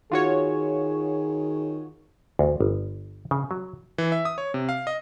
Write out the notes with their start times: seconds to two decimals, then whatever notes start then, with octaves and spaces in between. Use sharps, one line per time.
0.12 D#3 F4 F#4 G#4 C#5
2.39 D2
2.60 G1
3.31 C#3
3.51 F#3
3.98 E3
4.12 E5
4.25 D#6
4.38 C#5
4.54 C3
4.69 F5
4.87 D#5